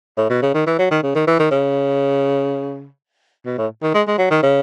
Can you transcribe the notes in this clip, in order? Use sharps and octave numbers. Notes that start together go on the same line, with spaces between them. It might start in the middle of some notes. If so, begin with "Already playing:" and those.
A2
B2
C#3
D#3
E3
F#3
D#3
C#3
D#3
E3
D#3
C#3
B2
A2
D#3
G#3
G#3
F#3
D#3
C#3